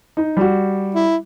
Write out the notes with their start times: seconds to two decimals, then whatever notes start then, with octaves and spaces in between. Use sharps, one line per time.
0.17 D#4
0.37 G3 F#4
0.95 E4